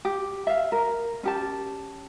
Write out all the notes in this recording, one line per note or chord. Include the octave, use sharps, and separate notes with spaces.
G4
E5 F5
A#4
C#4 G4 A5